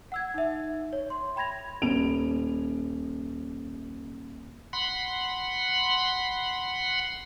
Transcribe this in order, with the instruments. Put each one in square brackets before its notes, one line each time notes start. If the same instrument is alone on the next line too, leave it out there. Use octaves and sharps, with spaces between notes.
[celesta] F#5 E6 G#6
D#4 E5
C#5
C6
G5 B5 G#6 A#6 F7
[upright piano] D#1 D7 F7
[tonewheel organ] F#5 B5 C6